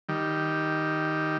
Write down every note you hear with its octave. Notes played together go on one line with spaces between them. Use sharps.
D#3 G3